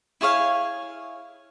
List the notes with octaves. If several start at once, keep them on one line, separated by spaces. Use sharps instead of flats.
E4 G#4 C#5 F5